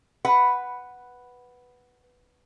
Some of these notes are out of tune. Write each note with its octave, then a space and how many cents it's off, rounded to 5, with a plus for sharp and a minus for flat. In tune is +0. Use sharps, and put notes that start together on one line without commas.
B4 +0 F#5 +0